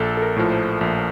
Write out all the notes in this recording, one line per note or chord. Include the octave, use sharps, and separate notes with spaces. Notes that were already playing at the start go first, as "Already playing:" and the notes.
Already playing: A#1 A4
A4
A#4
A2 F3
C5
A#1